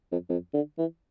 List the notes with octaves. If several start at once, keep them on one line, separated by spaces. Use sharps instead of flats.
F2
F2
D3
E3